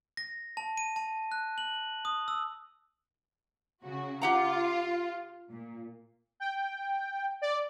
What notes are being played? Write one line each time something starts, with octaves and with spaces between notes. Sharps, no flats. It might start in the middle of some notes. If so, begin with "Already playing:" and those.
A#6
A5
D#7
A5
F#6
F#7
D#6
E6
C#3 F#4
F4 G4 F#5 A#5
A#2
G5
D5